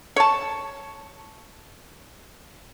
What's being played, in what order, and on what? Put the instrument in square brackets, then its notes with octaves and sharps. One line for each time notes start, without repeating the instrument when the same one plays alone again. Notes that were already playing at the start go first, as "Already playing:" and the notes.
[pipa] C#5 A5